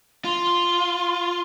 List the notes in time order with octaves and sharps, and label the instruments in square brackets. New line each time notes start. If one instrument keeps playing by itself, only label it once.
[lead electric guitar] F4 [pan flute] C6